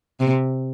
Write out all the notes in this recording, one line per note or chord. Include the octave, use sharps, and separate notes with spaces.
C3